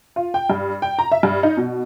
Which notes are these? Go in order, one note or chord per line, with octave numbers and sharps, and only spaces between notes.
F4
G5
G2
G5
A#5
E5
G2
D#4
B2